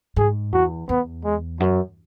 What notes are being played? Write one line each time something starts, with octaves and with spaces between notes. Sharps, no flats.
G#2 G#4
E2 F#4
E2 B3
G#3
F#2 F#3